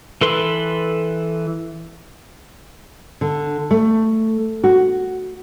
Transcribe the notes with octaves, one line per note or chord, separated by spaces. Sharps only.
E3 A4 B4 C6
D3
A3
F#4